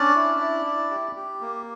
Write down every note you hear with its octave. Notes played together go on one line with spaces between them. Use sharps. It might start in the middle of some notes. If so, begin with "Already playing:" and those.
Already playing: C#4 D4 D5
E4
E4
E4
G4
G4
A#3